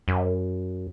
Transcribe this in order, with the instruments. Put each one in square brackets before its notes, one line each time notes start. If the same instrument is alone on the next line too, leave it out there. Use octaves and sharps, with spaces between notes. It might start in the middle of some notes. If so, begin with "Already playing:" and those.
[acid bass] F#2